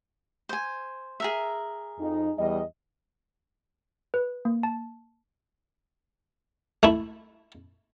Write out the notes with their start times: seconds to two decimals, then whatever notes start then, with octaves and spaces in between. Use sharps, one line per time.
0.49 C5 G#5
1.20 G#4 A#4 E5
1.99 F2 D#4
2.38 E2 G3 D#5
4.14 B4
4.45 A#3
4.63 A5
6.83 A3 E4